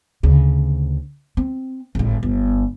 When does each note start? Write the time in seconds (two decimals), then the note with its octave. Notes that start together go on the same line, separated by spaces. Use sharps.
0.23 D2 C#3
1.37 C4
1.95 G#1 A2
2.23 G1